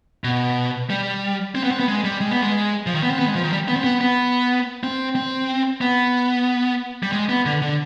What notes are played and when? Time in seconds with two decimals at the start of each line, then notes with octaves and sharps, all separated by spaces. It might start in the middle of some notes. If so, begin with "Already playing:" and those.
0.24 B2
0.90 G3
1.55 C4
1.64 B3
1.71 C4
1.80 B3
1.88 G#3
2.04 G3
2.21 G#3
2.31 B3
2.41 G#3
2.86 F3
2.95 D#3
3.02 B3
3.11 C4
3.19 B3
3.27 G#3
3.35 F3
3.44 D#3
3.52 G3
3.68 B3
3.76 C4
3.84 B3
4.01 B3
4.83 C4
5.15 C4
5.81 B3
7.03 G3
7.12 G#3
7.29 B3
7.45 D3
7.62 D3